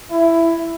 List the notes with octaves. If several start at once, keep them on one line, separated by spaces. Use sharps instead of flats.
E4